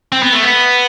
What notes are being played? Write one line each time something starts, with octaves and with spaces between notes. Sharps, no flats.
C4
B3
A3
B3